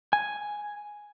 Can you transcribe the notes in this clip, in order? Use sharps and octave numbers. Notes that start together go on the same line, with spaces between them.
G#5